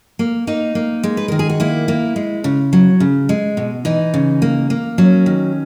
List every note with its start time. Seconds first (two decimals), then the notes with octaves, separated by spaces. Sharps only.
0.19 A#3
0.47 A#3 D#4
0.75 A#3
1.03 G#3
1.17 B4
1.28 D#3 A#4
1.39 G#4
1.49 F#4
1.60 A#3 E4
1.88 A#3
2.16 G#3
2.44 C#3
2.73 F#3
3.00 C#3
3.29 G#3
3.57 B2
3.85 E3 D#4
4.14 C#3
4.42 A#3
4.70 A#3
4.98 F#3 C#4
5.26 D#3